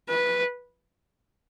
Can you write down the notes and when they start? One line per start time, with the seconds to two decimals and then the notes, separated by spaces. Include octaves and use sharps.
0.09 B4